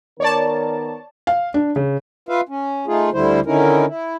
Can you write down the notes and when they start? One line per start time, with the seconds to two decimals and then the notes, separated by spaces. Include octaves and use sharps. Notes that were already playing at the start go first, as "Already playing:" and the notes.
0.20 D#3 B3 A#4 C#5 D5 A5
1.27 F5
1.54 D4
1.76 C#3
2.29 F4 B4 E5 F5
2.49 C#4
2.87 A3 D#4 F4 G#4
3.13 D2 D3 G3 E4 C5
3.46 D3 D#3 C#4 D#4 E4 A#4
3.87 E4